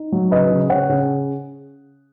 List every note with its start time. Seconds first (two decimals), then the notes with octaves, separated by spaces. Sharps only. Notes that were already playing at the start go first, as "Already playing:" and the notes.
Already playing: D#4
0.12 F#3
0.31 C#3 B4 D#5
0.50 C#3
0.70 C#3 C#5 F#5
0.89 C#3